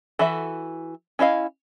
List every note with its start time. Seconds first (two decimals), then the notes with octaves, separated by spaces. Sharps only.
0.19 E3 F#4 A4 E5
1.19 C#4 E4 D#5 F5